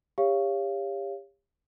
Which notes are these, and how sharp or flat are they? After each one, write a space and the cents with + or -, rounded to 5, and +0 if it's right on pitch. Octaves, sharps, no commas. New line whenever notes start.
G4 +35 C#5 +0 F5 -25